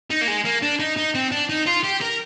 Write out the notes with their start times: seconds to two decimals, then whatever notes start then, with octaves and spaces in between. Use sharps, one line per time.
0.10 D#4
0.21 A#3
0.28 G#3
0.45 A#3
0.62 D4
0.80 D#4
0.97 D#4
1.15 C4
1.32 D4
1.50 D#4
1.67 F4
1.84 G4
2.01 A#4